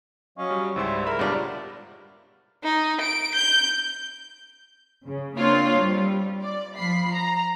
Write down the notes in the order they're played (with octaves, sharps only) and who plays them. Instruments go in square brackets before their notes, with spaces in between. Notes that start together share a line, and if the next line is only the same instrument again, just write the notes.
[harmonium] F#3 D#5 F5 [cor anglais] C#4
[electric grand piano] G3
[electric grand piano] C#2 G#2 C6 [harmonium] G3 C5 [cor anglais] E4
[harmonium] G#3 [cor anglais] A#4 [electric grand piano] E5 B5
[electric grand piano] G2 G3 F4 [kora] B3 D4
[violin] D#4
D7
G6
[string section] C#3
A#3 C4 D4 F4 C#5
G3
D5
F3 B5 C7
A#5